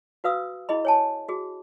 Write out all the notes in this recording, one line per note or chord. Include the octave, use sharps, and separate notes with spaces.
F#4 B4 F5 D#6 E6
E4 G#4 D#5 B5
C#5 G#5 A5
F#4 G#4